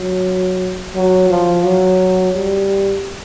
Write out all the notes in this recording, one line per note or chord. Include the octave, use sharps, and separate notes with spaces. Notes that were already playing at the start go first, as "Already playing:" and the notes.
Already playing: F#3
F#3
F3
F#3
G3